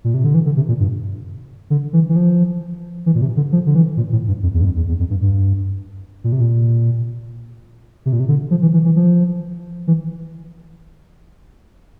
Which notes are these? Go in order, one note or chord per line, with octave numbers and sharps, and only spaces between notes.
A#2
C3
D3
E3
D3
C3
A#2
G2
D3
E3
E3
F3
E3
A#2
C3
D3
F3
D3
E3
A#2
A2
G2
F2
E2
G2
F2
E2
E2
F2
G2
G2
A#2
C3
A#2
C3
A#2
C3
D3
F3
E3
E3
E3
F3
E3